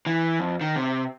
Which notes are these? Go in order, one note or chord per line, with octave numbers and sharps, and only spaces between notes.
E3
F2
D#3
C3